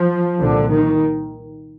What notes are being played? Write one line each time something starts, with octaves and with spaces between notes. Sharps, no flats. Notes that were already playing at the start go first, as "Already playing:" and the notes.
Already playing: F3
C2 A#2 D3
D#3